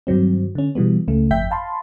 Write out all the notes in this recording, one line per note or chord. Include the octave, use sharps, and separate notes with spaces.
G2 D#3 F#3 C4
D3 C#4
B2 E3 G3 B3
C#2 C#3 A3
G1 F2 E5 G5 G6 B6
F5 A5 B5 C6